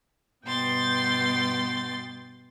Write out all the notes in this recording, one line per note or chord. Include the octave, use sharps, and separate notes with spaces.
G2 B2 G5 C6 A6